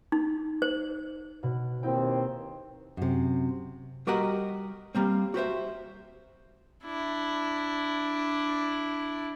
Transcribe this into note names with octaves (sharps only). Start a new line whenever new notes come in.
D#4
C5
B2
D#2 C4 D#4 E4 G5
F#2 C3
G3 F#4 G4 A#4 D#5 F#5
G3 A#3 C4
F#4 G4 C5 E5
D4 E4